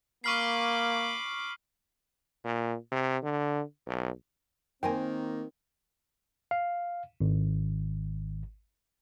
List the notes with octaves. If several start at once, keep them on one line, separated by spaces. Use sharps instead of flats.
A#3 B5 C#6 D6 F6 C7
A#2
C3
D3
B1
D#3 A#3 C4 A#4 C5 G5 G#5
F5
G#1